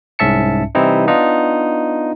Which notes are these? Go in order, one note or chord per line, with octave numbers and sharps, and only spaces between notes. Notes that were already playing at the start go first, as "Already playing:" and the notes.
C2 G#2 C#4 E5 A5 C#7
C3 E3 G3 C4 D#4 E4
B3 D4 D#4 F4